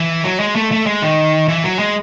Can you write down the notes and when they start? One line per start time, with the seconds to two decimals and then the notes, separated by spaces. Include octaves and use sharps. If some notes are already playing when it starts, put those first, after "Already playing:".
Already playing: E3
0.24 F#3
0.40 G#3
0.56 A3
0.71 A3
0.86 G#3
1.02 D#3
1.48 E3
1.64 F#3
1.79 G#3